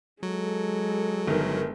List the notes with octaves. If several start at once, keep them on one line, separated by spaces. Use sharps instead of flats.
F#3 G#3 A4
G1 D#3